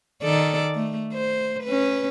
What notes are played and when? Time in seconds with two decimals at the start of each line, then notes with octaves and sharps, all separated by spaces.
0.23 D#3 A4 D5
0.74 A3
1.13 C5
1.64 C#4 B4